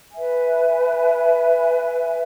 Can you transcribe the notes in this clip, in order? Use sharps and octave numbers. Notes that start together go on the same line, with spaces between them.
B4 E5 G#5